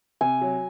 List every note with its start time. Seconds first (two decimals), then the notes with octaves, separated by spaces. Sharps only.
0.21 C3 G#5
0.41 F#3